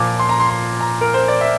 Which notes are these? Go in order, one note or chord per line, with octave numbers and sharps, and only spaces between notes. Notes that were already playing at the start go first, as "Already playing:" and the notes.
Already playing: A#2 F3 D6
C6
A#5
C6
C6
A#5
A#4
C5
D5
E5